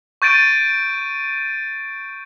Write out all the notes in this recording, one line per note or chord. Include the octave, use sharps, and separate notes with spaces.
C#6 G6 A6 D7 D#7